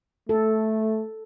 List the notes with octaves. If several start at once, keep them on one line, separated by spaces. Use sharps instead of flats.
A3 A4